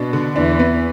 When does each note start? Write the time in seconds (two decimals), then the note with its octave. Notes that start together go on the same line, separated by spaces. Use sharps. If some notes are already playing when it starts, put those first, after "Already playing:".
Already playing: B2 D4
0.13 D3
0.36 E2 E3 D4
0.59 B3